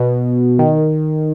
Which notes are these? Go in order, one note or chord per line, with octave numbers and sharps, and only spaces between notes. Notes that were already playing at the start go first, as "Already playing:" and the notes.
Already playing: B2
D#3